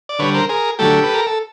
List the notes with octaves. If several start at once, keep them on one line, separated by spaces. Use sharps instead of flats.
D5
D3 G3 B4 C#5
A#4 C5
G#4 A#4
D3 F#3 A3 G4 A4
B4
A#4
A4